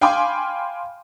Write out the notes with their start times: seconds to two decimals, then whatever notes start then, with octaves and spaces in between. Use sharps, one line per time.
0.01 F5 G5 G#5 B5 C6 D6